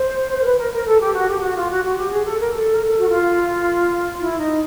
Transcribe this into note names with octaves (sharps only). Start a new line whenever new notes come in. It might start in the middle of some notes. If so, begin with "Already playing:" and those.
Already playing: C5
C5
A#4
B4
A#4
A#4
A4
G4
F#4
G4
F#4
F4
F#4
F#4
G4
G#4
A4
A#4
A4
A#4
A4
F#4
F4
E4
D#4